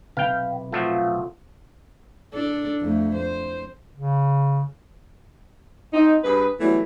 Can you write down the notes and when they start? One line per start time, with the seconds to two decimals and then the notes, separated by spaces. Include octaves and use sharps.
0.17 B1 C3 B4 F5 G5
0.73 F3 F#3 A3 F4
2.33 D4 A4
2.81 F2 A3
3.14 C5
3.94 C#3
5.93 C4 D#4
6.24 G2 G#4 B4
6.60 E3 F#3 G3 A3 B3